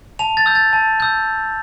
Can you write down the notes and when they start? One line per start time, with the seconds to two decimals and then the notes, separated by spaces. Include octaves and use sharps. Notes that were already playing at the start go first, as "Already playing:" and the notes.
0.19 A5 F7
0.37 A6
0.46 E6 G6
0.55 A6
0.73 A5
1.00 E6 G6